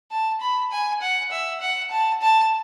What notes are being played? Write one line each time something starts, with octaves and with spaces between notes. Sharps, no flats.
A5
B5
G#5
F#5
E5
F#5
A5
A5